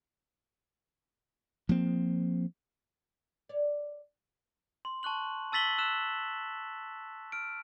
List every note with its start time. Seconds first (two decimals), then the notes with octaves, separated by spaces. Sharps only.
1.69 F3 A#3 C4
3.49 C#5 D5
4.85 C6
5.03 A5 C#6 F#6 F#7
5.52 A5 E6 A6 B6 F#7 G7
5.78 E6 F#6 E7
7.32 F6 D7